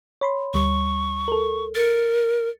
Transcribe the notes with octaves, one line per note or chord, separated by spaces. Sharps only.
C#5 B5 C6
D2 G3 C#6
A4 A#4
A#4 A6 C#7